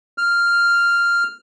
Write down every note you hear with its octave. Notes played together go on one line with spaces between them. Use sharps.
F6